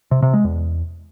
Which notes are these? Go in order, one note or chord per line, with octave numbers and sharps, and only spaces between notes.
C3
C3
G#3
E2